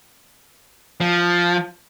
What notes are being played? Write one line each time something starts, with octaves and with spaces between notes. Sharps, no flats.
F3